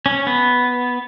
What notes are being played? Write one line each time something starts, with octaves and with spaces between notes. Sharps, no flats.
C#4
B3